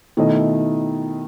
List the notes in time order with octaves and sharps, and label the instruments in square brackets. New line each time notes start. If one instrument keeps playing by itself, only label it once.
[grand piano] B2 A3 E4 A4 D#5 [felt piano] D#3